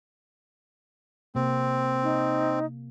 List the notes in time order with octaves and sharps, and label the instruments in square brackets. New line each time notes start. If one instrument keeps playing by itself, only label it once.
[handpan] C3 A#3 [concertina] C4
[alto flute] D#4